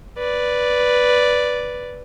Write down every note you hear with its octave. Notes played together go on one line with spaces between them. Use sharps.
B4 D5